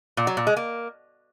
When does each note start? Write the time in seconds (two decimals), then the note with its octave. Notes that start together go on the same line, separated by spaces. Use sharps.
0.17 A#2
0.27 F#3
0.37 A#2
0.47 G#3
0.56 A#3